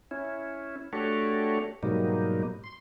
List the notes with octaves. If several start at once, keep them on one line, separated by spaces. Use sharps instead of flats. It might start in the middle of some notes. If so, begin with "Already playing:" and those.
C#4 E4
A3 D4 F#4 G4 A4 C#5
G#2 B2 F#3 G3 A#3 D#4
C6